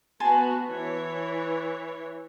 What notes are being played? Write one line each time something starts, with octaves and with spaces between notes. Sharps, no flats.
B3 F#4 G#5 A5 C6
E3 C#5